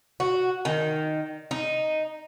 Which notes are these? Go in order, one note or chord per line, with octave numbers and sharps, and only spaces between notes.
F#4
D#3
D#4